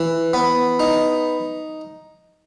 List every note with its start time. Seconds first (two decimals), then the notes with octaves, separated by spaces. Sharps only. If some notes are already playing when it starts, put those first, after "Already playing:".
Already playing: E3
0.34 B3
0.80 D#4